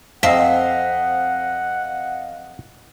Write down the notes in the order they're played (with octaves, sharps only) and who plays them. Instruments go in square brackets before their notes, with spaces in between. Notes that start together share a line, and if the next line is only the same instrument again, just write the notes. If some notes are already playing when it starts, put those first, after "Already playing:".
[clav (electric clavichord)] F2 [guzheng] C4 [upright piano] D#5 F5 B6 [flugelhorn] F#5